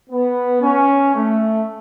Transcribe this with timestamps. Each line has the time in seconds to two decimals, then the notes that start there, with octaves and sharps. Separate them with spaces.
0.10 B3
0.62 C#4
1.15 A3